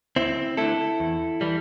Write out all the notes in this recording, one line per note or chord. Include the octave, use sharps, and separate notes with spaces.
D2 C4 E4
D3 A3 E4 A4
E2
E3 G3